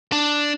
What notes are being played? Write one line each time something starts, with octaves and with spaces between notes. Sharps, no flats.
D4